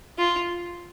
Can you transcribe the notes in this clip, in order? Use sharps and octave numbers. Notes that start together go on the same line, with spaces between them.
F4